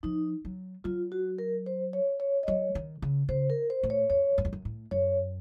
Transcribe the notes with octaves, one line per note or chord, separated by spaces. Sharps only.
F3 D#4
F#3
F#3 F4
F#4
A#4
C5
C#5
C#5
D#5
F#3 C#5
D#3
C#3
C#3 C5
A#4
C5
A2
C#5
F2 C#5
F#2
F2
F#2
A2
F#2 C#5